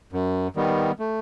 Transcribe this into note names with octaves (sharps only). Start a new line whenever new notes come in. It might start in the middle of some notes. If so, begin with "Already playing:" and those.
F#2
D#3 G3 B3
A3